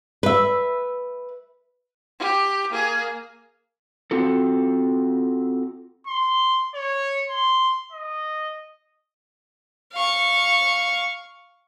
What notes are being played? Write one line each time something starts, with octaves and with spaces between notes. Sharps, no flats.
B4 E5
G4
A#3 G#4
C4 F4 F#4 A4
C6
C#5
C6
D#5
F5 C#6